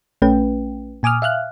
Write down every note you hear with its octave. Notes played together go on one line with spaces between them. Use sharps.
A#1 A3 C#4 B4 G5
A#2 G#5 D6 D#6 F6
E5 F5 F6 F#6